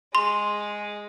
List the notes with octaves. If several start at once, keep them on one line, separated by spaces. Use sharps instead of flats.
G#3 C6